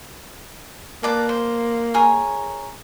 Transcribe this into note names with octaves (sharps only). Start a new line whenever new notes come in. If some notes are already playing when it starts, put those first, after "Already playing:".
A#3 B4 D5 A5
C5
G#4 A#4 C#5